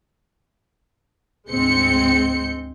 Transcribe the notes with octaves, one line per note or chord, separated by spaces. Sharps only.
D2 G#2 G#3 C4 G6 C#7